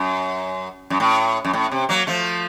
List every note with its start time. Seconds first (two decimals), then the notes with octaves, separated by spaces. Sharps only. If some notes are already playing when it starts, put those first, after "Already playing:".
Already playing: F#2
0.90 F#2
1.00 A2
1.45 F#2
1.53 A2
1.71 C3
1.89 F#3 A#3
2.07 F3 A3